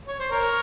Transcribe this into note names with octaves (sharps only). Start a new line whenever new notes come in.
C#5
C5
A#4 C#5